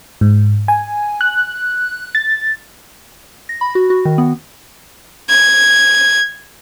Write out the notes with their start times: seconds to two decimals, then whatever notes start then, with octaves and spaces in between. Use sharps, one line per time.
0.21 G#2
0.68 G#5
1.21 F#6
2.15 A6
3.49 A#6
3.61 B5
3.75 F#4
3.90 F#4
4.05 D#3
4.18 B3
5.29 G#6